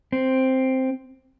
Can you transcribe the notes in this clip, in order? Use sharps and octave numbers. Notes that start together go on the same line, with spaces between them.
C4